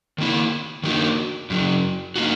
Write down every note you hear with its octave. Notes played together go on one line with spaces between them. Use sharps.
D#3 A#3 E4
D#3 A#3 D#4 F#4 A#4
F#2 C#3 F#3
A#3 D#4 F#4